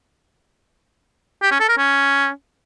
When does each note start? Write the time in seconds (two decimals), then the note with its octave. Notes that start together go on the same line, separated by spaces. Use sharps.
1.42 G4
1.51 C#4
1.60 A4
1.69 A#4
1.78 C#4